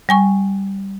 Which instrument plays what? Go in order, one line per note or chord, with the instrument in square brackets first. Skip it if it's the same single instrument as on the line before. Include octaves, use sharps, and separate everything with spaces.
[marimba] G3 G#5 C#6